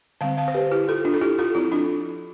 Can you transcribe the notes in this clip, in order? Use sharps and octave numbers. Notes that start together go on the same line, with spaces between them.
D3 G3 C4 F5 A5
F5 A5
C5
G4 B4
E4 G4
F4 A4
D4 F4
A4
E4 G4
F4 A4
F3 C4 E4
D4 F4